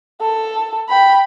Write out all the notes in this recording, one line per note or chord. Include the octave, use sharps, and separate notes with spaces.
A4
G5 B5